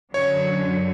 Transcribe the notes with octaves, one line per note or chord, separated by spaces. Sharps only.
F#2 D3 F#3 C#5